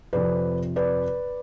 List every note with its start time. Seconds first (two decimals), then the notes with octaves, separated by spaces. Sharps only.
0.13 F2 C3 F3 B4 D5
0.76 B4 D5